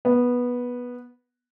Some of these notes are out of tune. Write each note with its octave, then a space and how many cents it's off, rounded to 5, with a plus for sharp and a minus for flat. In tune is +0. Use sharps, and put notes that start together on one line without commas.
B3 -10